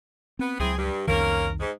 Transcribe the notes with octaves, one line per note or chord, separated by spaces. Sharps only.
B3 C4
C#2 F#3 C4 E4 G#4
G2
C2 F2 D#3 A#3 C#4 A#4
G#2